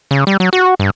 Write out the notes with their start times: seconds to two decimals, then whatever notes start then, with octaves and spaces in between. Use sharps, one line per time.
0.11 C#3
0.27 G3
0.40 F#3
0.53 F#4
0.80 G2